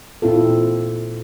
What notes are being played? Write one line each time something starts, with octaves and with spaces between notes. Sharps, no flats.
A#2 C4 E4 F4 A4